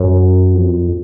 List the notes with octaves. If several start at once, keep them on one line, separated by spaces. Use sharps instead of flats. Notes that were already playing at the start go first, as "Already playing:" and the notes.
Already playing: F#2
F2